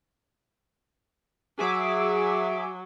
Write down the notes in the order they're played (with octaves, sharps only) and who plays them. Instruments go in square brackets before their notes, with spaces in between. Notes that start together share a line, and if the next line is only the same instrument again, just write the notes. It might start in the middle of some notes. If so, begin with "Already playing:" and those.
[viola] F#3 [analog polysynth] G#4 E5 D6